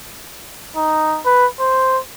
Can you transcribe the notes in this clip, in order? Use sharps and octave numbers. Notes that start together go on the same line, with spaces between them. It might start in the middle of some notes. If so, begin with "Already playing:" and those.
D#4
B4
C5